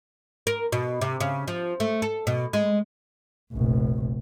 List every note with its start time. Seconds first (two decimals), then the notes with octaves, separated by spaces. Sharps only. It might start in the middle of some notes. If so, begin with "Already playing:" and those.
0.47 A#4
0.72 B2
1.01 C3
1.21 C#3
1.48 F3
1.80 A3
2.02 A4
2.27 B2
2.53 G#3
3.52 F1 A#1